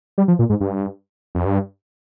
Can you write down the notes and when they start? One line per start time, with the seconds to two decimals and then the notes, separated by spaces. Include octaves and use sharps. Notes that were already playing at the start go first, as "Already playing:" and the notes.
0.18 G3
0.28 F3
0.39 A#2
0.50 G#2
0.61 G2
1.35 F2
1.46 G2